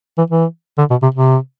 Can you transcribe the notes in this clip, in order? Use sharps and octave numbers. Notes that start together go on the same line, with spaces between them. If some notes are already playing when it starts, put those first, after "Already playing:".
E3
E3
D3
B2
C3
C3